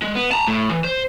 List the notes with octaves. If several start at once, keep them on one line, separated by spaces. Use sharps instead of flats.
G#3
B3
A5 A#5
A2
E3
C5